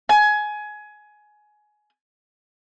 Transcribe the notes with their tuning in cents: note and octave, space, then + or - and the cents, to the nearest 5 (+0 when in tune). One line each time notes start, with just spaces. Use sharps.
G#5 +20